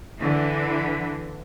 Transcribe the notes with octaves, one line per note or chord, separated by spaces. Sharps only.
D3 E3